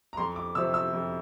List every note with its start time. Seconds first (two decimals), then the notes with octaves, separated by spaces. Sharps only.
0.13 A#5
0.17 F2 C6
0.36 D6
0.55 C3 F3 E6
0.74 E6
0.93 F2